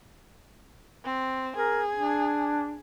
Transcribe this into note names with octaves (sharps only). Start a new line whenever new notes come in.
C4
G#4 A#4
D4